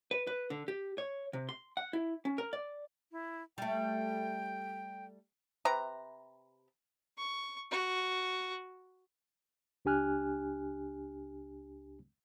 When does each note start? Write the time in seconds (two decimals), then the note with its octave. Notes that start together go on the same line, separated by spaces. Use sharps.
0.11 B4
0.27 B4
0.50 D3
0.68 G4
0.98 C#5
1.33 C3
1.49 C6
1.77 F#5
1.93 E4
2.25 C#4
2.38 A#4
2.53 D5
3.12 E4
3.58 G3 A3 G5
5.65 C3 B4 A#5
7.17 C#6
7.71 F#4
9.85 C#2 D4 G4 G#5 F6 F#6